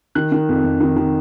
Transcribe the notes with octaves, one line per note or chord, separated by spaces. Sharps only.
D#3 F#6
D#3
F2
F2
D#3
D#3